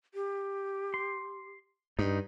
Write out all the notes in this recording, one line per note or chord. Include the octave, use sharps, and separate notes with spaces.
G4
C6
G2 D#4